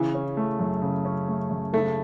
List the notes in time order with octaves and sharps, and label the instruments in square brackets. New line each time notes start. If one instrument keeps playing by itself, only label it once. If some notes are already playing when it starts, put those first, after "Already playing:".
Already playing: [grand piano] C#3 [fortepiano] E3
[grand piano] C#4
A3
F#2
C#3
C#4
A3
F#2
[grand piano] C#3 [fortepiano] A3